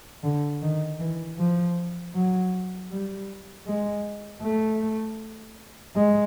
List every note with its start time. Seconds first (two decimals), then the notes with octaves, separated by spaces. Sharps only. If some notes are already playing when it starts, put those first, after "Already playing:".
0.23 D3
0.62 D#3
0.99 E3
1.38 F3
2.14 F#3
2.91 G3
3.67 G#3
4.42 A3
5.96 G#3